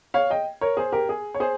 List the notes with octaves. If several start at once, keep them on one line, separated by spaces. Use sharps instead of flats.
C#5 F5
D#5 G5
A#4 C#5
G#4 C5
G4 A#4
G#4
C#5
G#4 C5